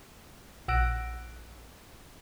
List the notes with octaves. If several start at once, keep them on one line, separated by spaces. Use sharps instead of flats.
A#1 F#5 E6 F#6 A#6 D7